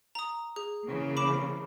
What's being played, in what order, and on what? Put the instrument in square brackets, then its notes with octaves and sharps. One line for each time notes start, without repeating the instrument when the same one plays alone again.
[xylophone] A#5 D#6
G#4
[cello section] C#3 E3 A#3
[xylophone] B5 D6 E7